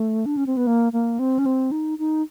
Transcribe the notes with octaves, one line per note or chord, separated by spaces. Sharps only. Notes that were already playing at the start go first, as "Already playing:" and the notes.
Already playing: A3
D4
C#4
C4
B3
A#3
A#3
C4
C#4
C4
D#4
D#4